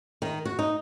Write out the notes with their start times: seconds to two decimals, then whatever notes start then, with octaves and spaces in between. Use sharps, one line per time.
0.22 D#3
0.45 F#4
0.59 D#4